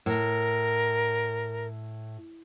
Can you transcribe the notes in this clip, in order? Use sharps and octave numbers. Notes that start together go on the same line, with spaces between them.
A2 A#4